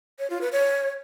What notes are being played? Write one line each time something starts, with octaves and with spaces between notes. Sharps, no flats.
C#5
F4
B4
C#5